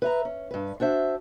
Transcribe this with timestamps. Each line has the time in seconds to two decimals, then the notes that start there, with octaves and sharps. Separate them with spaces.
0.02 B4 E5 A#5
0.25 C#4
0.51 G2 B4
0.80 D4 F#4 C5 E5